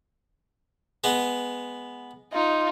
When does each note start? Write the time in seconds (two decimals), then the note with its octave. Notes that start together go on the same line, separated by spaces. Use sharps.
1.04 G#3 B3
2.33 D#4 F4